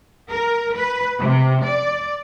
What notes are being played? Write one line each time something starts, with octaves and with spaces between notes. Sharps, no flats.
A#4
B4
C3
D5